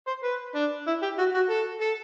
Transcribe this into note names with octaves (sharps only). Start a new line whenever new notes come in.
C5
B4
D4
E4
G4
F#4
F#4
A4
A4